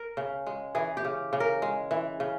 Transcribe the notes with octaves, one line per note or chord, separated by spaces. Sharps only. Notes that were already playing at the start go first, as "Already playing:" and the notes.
Already playing: A#4
C#3
G#3
E3 G#4
G4
C#3
C#3
A#4
G#3
E3
C#3